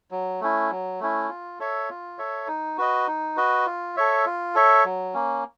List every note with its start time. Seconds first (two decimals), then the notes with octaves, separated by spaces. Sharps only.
0.11 F#3
0.41 A3 C#4 E4
0.70 F#3
1.00 A3 C#4 E4
1.29 F4
1.59 A4 C#5 E5
1.90 F4
2.19 A4 C#5 E5
2.48 D#4
2.78 F#4 B4 D#5
3.07 D#4
3.37 F#4 B4 D#5
3.66 F4
3.96 A4 C#5 E5
4.26 F4
4.55 A4 C#5 E5
4.85 F#3
5.14 A#3 C#4